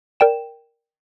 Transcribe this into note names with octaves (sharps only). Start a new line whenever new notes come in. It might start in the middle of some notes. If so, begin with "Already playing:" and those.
A#4 D5 G5 E7